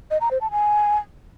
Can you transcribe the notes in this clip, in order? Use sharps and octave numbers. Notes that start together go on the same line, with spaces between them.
D#5
A#5
C5
A5
G#5